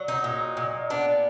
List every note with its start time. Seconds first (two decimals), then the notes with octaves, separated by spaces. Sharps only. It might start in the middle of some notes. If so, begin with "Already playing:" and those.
Already playing: F#3
0.08 D#4
0.24 A#2
0.57 A#2
0.90 B3 D4